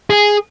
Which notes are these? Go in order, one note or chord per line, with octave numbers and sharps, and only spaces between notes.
G#4